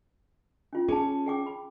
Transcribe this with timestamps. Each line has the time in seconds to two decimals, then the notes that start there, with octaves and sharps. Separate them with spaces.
0.73 C#4 F4
0.89 C#4 G#4 A5
1.26 G#4 G5 D6
1.46 B5